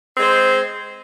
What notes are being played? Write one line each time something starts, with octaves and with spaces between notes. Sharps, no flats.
G#3 C4 C5